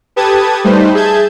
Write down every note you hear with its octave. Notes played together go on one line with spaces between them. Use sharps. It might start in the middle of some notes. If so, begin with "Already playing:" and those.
G4 A4 B4 A5 D#6 G#6
G3 A3 D#4 B4 C5
G#4 E5 A5 G6 G#6